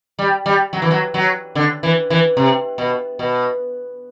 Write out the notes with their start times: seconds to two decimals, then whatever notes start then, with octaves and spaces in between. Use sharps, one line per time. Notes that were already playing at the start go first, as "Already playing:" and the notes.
0.19 G3
0.46 G3
0.73 F#3
0.82 E3
0.91 F#3
1.14 F#3
1.55 D3
1.83 E3
2.10 E3
2.37 C3
2.78 B2
3.19 B2